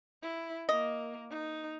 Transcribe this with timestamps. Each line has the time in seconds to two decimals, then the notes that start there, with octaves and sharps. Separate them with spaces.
0.23 E4
0.69 A#3 D#5
1.30 D#4